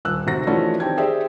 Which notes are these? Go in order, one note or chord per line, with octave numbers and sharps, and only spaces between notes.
D#1 E6 F#6
F1 C3 F#4 A#6
E3 F3 A3 C#4 D4 F#4
D#3 C4 G4 G5 A5 G#6
G4 G#4 C5 D5 E5 G5